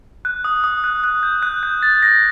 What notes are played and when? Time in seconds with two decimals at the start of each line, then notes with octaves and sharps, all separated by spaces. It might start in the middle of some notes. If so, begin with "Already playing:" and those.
0.25 F#6
0.44 D#6
0.64 D#6
0.84 F#6
1.04 F#6
1.23 G6
1.42 F#6
1.63 G6
1.82 A6
2.03 A#6